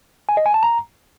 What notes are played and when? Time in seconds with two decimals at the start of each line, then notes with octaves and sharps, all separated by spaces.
0.29 G#5
0.37 D#5
0.46 G#5
0.54 A5
0.63 A#5